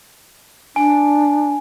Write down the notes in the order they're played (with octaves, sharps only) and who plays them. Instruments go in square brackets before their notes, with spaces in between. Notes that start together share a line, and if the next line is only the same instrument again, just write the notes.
[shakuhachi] D4 [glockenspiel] G#5